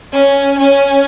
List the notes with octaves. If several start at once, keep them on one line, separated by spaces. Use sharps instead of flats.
C#4
C#4